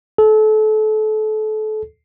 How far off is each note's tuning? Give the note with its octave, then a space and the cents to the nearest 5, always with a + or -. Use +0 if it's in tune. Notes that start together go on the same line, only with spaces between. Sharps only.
A4 -30